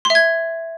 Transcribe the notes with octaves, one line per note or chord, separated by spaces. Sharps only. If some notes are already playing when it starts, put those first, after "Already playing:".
C6
E5
G#6